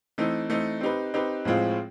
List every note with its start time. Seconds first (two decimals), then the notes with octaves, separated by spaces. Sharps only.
0.18 E3 A3 C4 D#4
0.50 E3 A3 C4 D#4
0.81 C4 D#4 G4 B4
1.14 C4 D#4 G4 B4
1.45 A2 F3 G#3 C4 F4